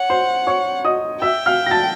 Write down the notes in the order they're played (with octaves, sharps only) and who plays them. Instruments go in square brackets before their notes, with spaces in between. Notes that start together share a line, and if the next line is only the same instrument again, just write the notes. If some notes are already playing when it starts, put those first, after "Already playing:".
Already playing: [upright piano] C#5 [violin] F#5
[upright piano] C5 C6
C#5 C#6
D#5 D#6
[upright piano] E5 E6 [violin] G5
[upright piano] F5 F6
A#6
A5 A6